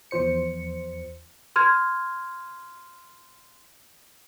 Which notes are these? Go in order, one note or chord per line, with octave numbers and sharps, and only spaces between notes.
E2 F3 C5 C#7
C6 F6 G#6